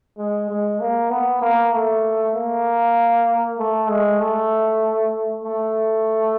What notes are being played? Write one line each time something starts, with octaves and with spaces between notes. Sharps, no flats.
G#3
G#3
A#3
B3
A#3
A3
A#3
A3
G#3
A3
A3